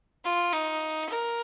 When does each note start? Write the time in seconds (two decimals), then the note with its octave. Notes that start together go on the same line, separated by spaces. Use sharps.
0.24 F4
0.53 D#4
1.09 A#4